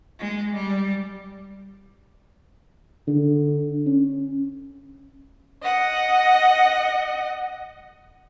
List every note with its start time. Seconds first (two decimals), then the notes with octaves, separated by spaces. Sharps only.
0.19 G#3
0.54 G3
3.07 D3
3.86 C#4
5.63 D#5 F#5